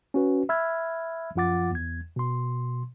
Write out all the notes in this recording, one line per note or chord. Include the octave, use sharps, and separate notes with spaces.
C#4 F#4 B4
E5 B5 E6 F6 G#6
F#2 F3 F4 F#5 D6 A6
E2 G#6
B2 C6